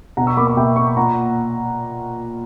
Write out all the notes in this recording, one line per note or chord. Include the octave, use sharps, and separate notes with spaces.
B2 F#5 A#5
C#6 E6
A#3 B5 D6
B5 D6
B2 E5 G5
A#3 C#6
B5
A#2 F#5 A#5